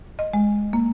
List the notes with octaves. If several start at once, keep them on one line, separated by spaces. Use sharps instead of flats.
D#5
G#3
A#3